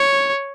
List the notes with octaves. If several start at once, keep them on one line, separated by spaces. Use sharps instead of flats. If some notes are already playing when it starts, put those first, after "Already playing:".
Already playing: C#5